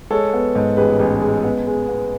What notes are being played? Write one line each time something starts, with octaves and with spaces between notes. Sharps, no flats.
G#3 A4 C#5
B3
G#2
A1 G#4 B4
A1
G#3
B3
G#3
B3